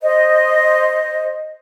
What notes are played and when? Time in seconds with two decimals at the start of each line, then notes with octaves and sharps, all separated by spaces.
0.01 C5 D#5